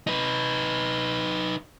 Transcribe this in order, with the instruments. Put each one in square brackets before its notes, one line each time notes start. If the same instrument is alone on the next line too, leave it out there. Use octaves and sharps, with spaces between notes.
[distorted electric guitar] D#4 B4